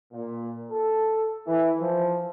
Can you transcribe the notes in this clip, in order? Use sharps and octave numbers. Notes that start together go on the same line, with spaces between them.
A#2
A4
E3
F3